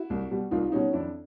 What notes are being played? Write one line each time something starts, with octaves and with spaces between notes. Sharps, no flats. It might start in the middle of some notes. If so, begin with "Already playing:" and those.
Already playing: E4 F#4
C2
B2 G3
C2 D#4 F4
B2 G3 C#4 D#4
F2 D4 E4